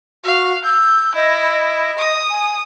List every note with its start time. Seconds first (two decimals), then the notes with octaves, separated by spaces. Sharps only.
0.24 F#4 F5
0.64 E6 G6
1.15 E4 D#5
1.98 D#6
2.30 G#5